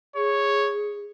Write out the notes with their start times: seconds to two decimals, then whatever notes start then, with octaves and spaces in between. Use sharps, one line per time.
0.16 G#4 C#5